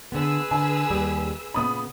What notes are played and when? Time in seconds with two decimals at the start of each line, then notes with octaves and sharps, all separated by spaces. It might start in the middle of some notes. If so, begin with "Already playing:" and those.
0.12 D3 B3 G#4 B4 E6
0.51 D3 G#5
0.90 D#2 G3 G4
1.54 A#2 C#3 B3 B5 D#6